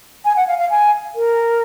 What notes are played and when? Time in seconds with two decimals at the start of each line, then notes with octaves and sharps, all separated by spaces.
0.25 G#5
0.36 F#5
0.48 F5
0.59 F5
0.70 G#5
1.15 A#4